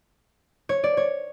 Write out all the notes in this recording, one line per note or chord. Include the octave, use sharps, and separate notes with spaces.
C#5
D5
C#5